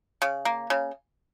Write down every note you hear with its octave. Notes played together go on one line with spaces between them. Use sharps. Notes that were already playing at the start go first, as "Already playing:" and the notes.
C#3
A#3
C#3